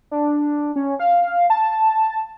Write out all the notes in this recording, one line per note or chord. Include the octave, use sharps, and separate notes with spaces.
D4
C#4
F5
A5